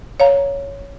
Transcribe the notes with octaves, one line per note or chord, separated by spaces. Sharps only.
C#5 F5 A#5